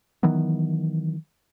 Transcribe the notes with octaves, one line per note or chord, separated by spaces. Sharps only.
D#3 E3 F#3 B3